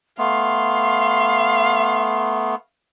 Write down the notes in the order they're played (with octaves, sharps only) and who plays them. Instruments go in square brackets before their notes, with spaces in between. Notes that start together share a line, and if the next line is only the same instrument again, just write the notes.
[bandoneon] A3 B3 [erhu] F5 [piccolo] C6